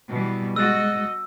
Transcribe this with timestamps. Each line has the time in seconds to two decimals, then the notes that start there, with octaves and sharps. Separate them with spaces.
0.11 B2 E3 G3
0.56 G#3 F#4 D#5 E6 F#6 A6